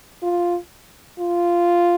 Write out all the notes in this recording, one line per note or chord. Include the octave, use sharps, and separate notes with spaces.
F4
F4